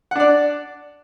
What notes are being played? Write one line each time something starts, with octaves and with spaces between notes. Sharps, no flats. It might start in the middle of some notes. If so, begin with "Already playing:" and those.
D4 D5 F#5